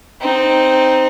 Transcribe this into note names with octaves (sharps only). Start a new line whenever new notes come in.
C4 D#4